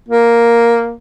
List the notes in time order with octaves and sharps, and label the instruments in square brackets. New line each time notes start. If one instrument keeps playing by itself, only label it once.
[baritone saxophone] A#3